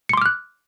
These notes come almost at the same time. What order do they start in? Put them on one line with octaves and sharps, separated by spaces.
C#7 C6 D6 F6 F#6